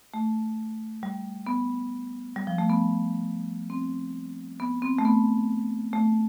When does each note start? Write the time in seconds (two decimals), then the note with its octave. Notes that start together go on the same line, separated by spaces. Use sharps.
0.14 A3
1.03 G3
1.46 B3
2.36 G3
2.47 F3
2.58 A3
2.70 B3
3.70 C4
4.60 B3
4.82 C4
4.99 A3
5.05 B3
5.93 A3